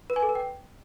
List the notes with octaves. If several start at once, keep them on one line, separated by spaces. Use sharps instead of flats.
B4
G#5
A4
B4
G5